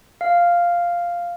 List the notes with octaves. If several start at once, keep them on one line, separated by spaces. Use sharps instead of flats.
F5